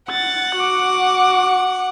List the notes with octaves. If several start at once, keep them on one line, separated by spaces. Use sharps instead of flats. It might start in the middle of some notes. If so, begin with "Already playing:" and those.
F#5 A6
F#4 D6